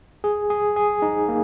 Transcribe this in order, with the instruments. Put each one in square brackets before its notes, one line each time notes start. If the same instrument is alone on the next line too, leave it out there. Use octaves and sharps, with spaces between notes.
[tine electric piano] G#4
G#4
G#4
D#4
A#3